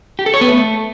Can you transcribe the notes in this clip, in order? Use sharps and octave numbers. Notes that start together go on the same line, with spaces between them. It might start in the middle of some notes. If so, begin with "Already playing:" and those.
G4
A4
C#5
B3
A3